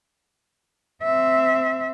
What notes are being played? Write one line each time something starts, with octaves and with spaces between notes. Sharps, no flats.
C4 E5